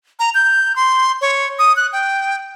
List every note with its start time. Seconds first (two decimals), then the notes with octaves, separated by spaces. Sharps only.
0.19 A#5
0.35 G6
0.76 C6
1.21 C#5
1.59 D#6
1.76 F#6
1.93 G5